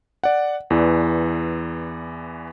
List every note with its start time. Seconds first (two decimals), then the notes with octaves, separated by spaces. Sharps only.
0.24 D5 F#5
0.70 E2 E3 D5